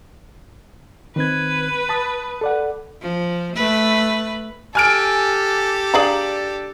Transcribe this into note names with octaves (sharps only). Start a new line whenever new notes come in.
D#3 C4 B4 G#6
A5 B5 D#6
A4 D5 F#5
F3
A3 B4
G4 A4 G#5 F6 D7
D4 G#4 F5 A#5 F#7